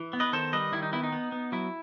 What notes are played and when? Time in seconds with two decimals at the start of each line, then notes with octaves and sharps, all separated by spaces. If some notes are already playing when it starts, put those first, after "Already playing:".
Already playing: E3
0.13 B3
0.20 B4 D#5
0.33 D#3 A4 C5
0.53 G3 B4 D#5
0.72 D#3 E4
0.83 D#4
0.93 B3 E4
1.03 D#4
1.12 B3
1.32 B3
1.52 F#3 E4